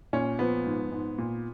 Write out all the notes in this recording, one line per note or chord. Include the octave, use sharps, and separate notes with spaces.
A#2 C#4
F3 B3
G#2
G#2
A#2